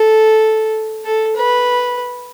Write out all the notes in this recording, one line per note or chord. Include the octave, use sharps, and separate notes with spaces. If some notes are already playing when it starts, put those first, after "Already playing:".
Already playing: A4
A4
B4